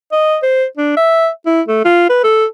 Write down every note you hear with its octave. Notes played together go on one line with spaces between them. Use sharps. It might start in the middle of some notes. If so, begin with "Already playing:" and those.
D#5
C5
D4
E5
E4
A3
F4
B4
A4